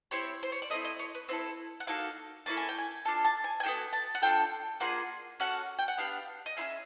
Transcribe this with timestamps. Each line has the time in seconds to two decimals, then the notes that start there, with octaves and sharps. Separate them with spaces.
0.11 C4 E4 G4 C#5
0.43 C5
0.52 C#5
0.62 D5
0.70 A3 C4 E4 D#5
0.85 D#5
0.99 C#5
1.15 B4
1.29 C4 E4 A4 C5
1.80 F#5
1.87 A#3 D#4 F#4 A4 F5
2.46 A#3 C#4 E4 A4 A5
2.57 G#5
2.69 G5
2.78 G#5
3.05 D4 F4 A4 A5
3.25 A5
3.44 G#5
3.60 G#5
3.63 B3 D4 F#4 A4 G5
3.93 A5
4.15 F#5
4.22 D4 F4 A4 G5
4.80 A#3 D4 F4 G#4 F#5
5.40 C#4 F#4 A4 F#5
5.79 G5
5.88 F#5
5.98 B3 D4 G4 F5
6.46 D#5
6.57 C#4 E4 G#4 E5